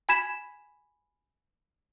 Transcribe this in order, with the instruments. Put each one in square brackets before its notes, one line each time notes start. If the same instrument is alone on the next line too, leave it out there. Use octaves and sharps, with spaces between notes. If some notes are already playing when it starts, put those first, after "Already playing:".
[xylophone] G#5 B5 G#6 B6 E7